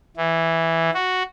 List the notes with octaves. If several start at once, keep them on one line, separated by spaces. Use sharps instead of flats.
E3
F#4